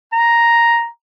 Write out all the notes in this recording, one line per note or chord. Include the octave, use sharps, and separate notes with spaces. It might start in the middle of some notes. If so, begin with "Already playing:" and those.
A#5